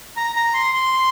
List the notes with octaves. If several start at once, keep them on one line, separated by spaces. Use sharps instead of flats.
A#5
A#5
C6
C6